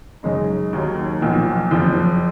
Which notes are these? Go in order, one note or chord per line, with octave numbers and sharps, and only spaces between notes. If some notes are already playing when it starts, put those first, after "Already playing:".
F#2 C#3 G#3 D#4
D#2 D#3 F#3 A#3
B1 A#2 F3
F#1 F2 F3